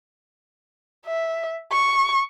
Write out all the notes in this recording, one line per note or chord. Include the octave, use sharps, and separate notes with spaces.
E5
C#6